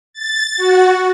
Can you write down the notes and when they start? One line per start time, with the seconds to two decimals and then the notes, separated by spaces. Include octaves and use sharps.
0.13 A6
0.57 F#4